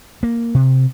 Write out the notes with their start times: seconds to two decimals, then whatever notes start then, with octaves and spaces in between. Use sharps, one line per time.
0.23 A#3
0.55 C3